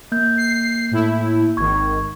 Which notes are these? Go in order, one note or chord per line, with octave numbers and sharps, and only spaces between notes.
A#3 G6
C7
A2 E4
G#1 D#3 C#6 G#6